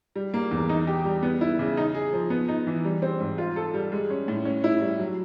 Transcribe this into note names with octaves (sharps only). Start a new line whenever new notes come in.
G3
A#3
E2
D#4
G4
G3
B3
E4
C#3
D#4
G#4
F3
B3
D#4
E3
G3
C4
G#2
F4
A4
G3
G#3
C#4
A2
C#4
E4
G3
F#3